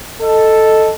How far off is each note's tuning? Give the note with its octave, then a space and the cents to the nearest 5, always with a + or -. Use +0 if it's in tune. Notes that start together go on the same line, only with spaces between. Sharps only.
A4 +0 D#5 +0